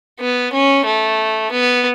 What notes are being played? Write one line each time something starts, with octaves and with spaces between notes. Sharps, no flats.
B3
C#4
A3
B3